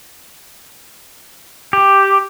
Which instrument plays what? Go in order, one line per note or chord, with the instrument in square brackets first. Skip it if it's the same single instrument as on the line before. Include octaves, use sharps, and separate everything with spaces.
[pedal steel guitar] G4